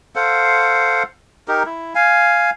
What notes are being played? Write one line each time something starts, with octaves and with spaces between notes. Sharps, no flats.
A4 C5 F5 F#5
D#4 G4 A#4
E4
F5 G#5